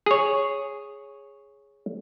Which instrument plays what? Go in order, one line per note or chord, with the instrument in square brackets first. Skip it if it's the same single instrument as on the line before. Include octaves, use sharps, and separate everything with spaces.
[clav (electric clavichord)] G#4 C#5